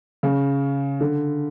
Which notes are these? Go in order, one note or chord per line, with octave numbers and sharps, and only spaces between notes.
C#3
D3